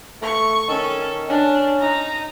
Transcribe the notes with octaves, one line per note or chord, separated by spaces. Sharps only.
A3 C#6
D#3 C#4 A4
C#4 D4
D#4 A#5